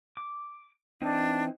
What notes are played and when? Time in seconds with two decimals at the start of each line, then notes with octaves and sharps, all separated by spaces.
0.17 D6
1.02 E3 C4 D4 D#4